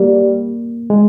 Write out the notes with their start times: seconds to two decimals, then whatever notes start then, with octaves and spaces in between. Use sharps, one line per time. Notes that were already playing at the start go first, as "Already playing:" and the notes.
Already playing: G3 A#3
0.90 G#3